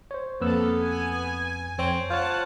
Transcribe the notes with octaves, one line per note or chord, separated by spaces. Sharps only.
C5 C#5
F2 A#3 B3 A4 B4 E6
G#5
F2 C4 C#5
F4 C5 C#5 F#5 A5